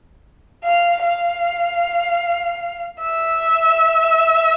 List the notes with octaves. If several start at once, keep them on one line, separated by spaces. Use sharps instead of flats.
F5
F5
E5